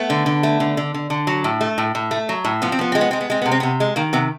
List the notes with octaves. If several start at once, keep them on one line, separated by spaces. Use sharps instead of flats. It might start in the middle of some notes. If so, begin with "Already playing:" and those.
Already playing: A3 B3
D3
D3
A3
D3
D3
D3
D3
F#3
A2
A3
A2
A2
A3
F#3
A2
F3 B3
C4
F3 B3
G#3 C4
B3
G#3 C4
B3
G#3 C4
C3 B3
C4
C3 B3
G#3
D#3 A#3
C3 B3